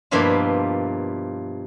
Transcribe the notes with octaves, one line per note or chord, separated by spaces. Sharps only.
G2 B2 F3 A#3 E4 F4